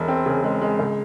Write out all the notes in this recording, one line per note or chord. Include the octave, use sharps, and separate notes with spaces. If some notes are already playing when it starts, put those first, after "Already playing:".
Already playing: E1
C4
C#3
G#3
G#3
C#2